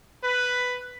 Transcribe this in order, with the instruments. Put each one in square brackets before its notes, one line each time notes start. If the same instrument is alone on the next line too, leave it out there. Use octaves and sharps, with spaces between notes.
[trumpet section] B4